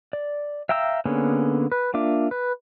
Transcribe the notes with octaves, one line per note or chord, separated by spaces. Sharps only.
D5
E5 F5 G5 A#5 E6
D3 A#3 B3 C#4 G#4
B4
A#3 D4 F4 E5 D6
B4